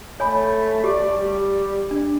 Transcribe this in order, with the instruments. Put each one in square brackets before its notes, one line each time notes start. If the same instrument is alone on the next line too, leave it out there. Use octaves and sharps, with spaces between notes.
[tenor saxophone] A3 [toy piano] C#5 G#5 B5
[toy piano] G4 [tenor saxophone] D5
[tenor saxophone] G3
[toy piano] D4